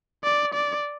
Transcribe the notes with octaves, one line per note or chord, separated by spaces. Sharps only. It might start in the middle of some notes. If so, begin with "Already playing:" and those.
D5
D5